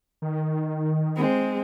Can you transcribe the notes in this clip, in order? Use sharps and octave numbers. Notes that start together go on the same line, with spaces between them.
D#3
G#3 C4